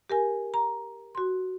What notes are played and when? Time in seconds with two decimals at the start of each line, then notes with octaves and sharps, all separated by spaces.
0.10 G4 A#4 G#5
0.54 A#5
1.15 F#4 C6